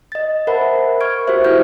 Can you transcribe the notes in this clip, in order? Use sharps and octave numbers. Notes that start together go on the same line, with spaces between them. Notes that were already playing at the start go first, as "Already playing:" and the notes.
D#5 A6
A#4 C5 E5 F#5 A5 B5
C#6 F6 G#6 D7
F#4 G4 B4 C5 E5
E4 E5 F6 G6